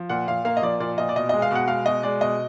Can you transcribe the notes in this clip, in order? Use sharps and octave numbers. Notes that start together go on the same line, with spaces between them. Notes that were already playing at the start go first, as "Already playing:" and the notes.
Already playing: F3
A#2 F#5
A#2 F5
A#3 F5
D#5
F3 D5
A#2 D5
A#2 D#5
D5
B2 D#5
G#3 D#5
F5
B2 F#5
G#3 F5
B2 D#5
G#3 D5
B2 D#5